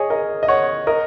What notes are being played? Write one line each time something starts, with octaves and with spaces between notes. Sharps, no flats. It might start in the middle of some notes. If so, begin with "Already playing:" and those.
Already playing: G#4 C#5 D#5
A#4 D#5
D#5
C#5 F#5
A#4 D#5